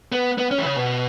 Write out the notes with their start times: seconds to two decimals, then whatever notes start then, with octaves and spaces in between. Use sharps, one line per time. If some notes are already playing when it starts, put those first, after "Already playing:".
0.12 B3
0.38 B3
0.51 C#4
0.58 E3
0.65 C#3
0.76 B2